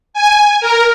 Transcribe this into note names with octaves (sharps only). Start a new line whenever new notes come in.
G#5
A#4